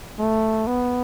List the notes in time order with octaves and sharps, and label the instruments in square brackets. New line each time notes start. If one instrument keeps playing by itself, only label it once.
[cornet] A3
B3